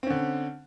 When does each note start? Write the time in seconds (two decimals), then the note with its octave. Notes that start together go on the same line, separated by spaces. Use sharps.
0.03 C4
0.07 C#4
0.10 D3